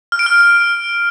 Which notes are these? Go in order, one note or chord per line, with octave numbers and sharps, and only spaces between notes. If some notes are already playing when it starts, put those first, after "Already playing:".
F6
D7
F6